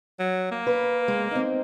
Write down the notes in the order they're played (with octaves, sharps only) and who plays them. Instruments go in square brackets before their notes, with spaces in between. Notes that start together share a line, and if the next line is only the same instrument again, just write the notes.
[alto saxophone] F#3
A#3
[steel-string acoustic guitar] B4
G#3
C4 D#4